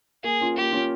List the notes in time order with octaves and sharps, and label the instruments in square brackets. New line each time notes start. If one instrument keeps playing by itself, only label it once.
[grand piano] A#3 [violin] G#4
[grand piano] C#4 F4
[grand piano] A#3 [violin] G4
[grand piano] C#4 F4